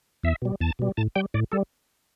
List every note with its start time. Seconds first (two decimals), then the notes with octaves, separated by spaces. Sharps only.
0.23 E2 E5
0.42 B2 G3
0.61 E2 A5
0.79 B2 G3
0.97 A2 A5
1.16 G3 G5
1.34 A2 D5
1.52 G3 A4